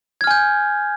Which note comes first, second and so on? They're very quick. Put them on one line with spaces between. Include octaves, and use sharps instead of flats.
G#6 F6 G#5 G6